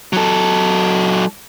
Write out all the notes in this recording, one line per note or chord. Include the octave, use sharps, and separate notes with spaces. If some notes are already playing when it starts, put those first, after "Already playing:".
F#3 A4